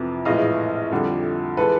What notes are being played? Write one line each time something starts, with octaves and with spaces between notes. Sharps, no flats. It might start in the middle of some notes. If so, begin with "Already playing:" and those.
Already playing: F2 C3 E3
A#1 A2 E3 G#3 D#5 F5
F2 D3 G3
E3 G#3 A4 B4